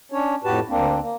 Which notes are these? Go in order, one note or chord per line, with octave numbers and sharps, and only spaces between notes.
C#4 D4 C#5
F2 A2 F#4 G4 B4 A5
D2 A#3 C4 D4
A#3